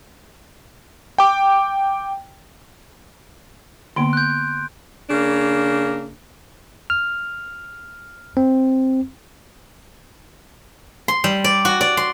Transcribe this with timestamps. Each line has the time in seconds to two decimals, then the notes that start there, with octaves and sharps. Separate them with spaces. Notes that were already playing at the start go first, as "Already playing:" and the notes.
1.18 G5 D6
3.96 D3 A#3 B3 C6 D7
4.13 F#6 G6
5.10 C#3 A#3 D4
6.90 F6
8.37 C4
11.08 C6
11.24 G3
11.44 D5
11.65 F#4
11.81 D5
11.97 C6